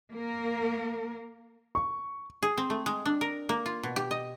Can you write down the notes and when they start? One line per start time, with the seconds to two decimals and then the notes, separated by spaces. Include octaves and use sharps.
0.12 A#3 A#4
1.75 C#6
2.43 G#4
2.58 C4
2.70 A3
2.86 G#3
3.05 D4
3.21 A#4
3.49 A#3
3.66 F4
3.83 B2
3.96 G4
4.11 D#5